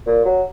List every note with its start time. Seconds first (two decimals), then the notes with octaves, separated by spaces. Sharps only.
0.07 A#2
0.25 F#3